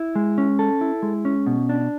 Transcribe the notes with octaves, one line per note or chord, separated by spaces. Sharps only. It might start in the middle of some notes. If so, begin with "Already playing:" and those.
Already playing: E4
G#3
C#4
A4
E4
G#3
C#4
B2
D4